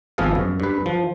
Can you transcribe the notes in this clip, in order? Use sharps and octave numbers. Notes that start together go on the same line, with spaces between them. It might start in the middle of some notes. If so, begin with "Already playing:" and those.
G#1 F3 B3 G#4 A4 F5
F#2
G2 B4
F3